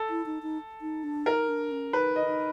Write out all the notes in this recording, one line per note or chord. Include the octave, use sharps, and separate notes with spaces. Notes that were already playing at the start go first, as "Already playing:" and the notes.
Already playing: A4
E4
D#4
D#4
D#4
D4
D#4 A#4
D4
C#4
D#4 B4
D#5
D#4